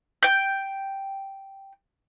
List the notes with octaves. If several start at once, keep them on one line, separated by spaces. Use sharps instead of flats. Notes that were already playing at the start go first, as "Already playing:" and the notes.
G5 G6